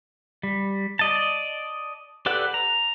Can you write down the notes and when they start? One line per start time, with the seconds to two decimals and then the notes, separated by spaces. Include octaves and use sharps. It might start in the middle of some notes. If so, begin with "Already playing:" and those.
0.43 G3
0.99 D5 D#5 A5
2.26 G4 A4 B4 D5 F#5
2.54 A#5